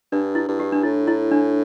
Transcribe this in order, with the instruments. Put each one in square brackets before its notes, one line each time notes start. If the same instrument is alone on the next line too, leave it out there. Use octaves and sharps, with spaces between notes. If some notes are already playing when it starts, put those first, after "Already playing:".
[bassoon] G2 [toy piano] D4
[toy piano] E4
[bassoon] G2
[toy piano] G4
D4
[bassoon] A2 [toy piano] E4
[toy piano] E4
D4